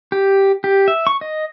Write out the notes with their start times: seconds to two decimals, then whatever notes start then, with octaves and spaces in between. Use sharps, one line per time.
0.12 G4
0.64 G4
0.88 E5
1.07 C#6
1.21 D#5